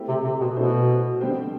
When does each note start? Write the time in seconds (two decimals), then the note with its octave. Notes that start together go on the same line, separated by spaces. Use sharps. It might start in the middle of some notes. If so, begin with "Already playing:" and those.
Already playing: A3 C4 E4 G4
0.09 C3
0.24 C3
0.40 B2
0.56 B2 A3 E4 A4 C5
1.21 D3 G3 C4 G4 C5